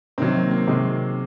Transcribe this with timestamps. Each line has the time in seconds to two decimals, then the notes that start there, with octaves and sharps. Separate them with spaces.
0.18 C3 D#3 F#3 C4
0.35 A#3
0.51 C4
0.68 C3 D#3 F#3 G#3